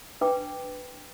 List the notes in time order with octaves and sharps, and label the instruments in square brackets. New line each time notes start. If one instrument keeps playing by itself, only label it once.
[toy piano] D4 B4 G5 D6